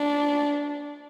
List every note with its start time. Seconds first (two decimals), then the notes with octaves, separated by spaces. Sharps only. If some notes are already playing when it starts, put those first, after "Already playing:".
Already playing: D4